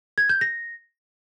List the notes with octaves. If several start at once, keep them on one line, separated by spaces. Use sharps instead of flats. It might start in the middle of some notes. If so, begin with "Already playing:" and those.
G#6
G6
A#6